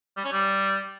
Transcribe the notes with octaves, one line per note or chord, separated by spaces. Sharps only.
G3
C#4
G3